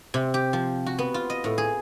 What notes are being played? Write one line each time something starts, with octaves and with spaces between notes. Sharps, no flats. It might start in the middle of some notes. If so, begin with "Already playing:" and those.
C3
G4
F3
F#4
B3
F4
D#5
A2
G#4